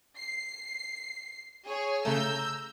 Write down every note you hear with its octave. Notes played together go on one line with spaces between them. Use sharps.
C7
G#4 C#5
C#3 A3 A#5 E6 G6